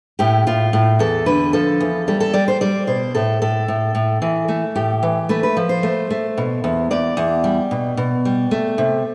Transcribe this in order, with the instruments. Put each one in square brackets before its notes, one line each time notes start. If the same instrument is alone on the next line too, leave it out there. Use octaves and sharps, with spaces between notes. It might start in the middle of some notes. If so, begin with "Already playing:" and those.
[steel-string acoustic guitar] A2 G4
A2 F4
A2
E2 A4
D3 B4
F3 A4
E2
G3 A4
A4
G3 D5
C5
G3 D5
B2 C5
A2 A4
A2 A4
A2
A2
E3
A3
A2 G4
E3
A3 B4
B4
F3
C5
A3
A3
B2
E2
E2 D5
E2
G3
B2
B2
G3
A3
C3